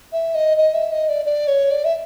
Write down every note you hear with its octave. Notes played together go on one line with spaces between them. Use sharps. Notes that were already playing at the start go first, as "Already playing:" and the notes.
E5
D#5
D#5
E5
D#5
D5
D5
C#5
D5
E5